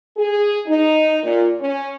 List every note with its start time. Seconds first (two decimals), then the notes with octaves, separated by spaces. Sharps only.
0.17 G#4
0.67 D#4
1.22 A#2
1.59 C#4